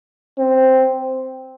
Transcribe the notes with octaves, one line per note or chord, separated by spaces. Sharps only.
C4